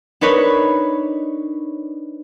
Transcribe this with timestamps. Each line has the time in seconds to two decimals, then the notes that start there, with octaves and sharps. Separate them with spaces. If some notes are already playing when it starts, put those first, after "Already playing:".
0.21 D4 D#4 A#4 B4 C#5 B5